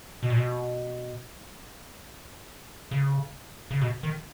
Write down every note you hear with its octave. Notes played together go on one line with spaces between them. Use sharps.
B2
A#2
B2
C#3
C#3
B2
D#3